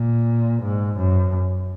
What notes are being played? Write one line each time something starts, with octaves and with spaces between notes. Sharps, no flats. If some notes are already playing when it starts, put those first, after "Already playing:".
Already playing: A#2
G#2
F#2